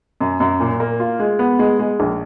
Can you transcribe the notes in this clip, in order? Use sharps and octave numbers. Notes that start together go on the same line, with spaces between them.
F#2
F#2
A#2
A#3
F4
G#3
B3
G#3
G#3
A#1